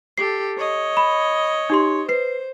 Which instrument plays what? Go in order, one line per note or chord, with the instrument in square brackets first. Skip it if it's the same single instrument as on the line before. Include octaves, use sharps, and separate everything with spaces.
[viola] G4 A4 [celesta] C7
[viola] C#5 D#5
[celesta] B5
D#4 G4 C6
[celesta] B4 C7 [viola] C5